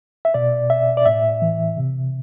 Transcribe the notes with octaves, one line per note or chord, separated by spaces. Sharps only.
E5
B2 D5
E5
D5
A2 E5
E3
C3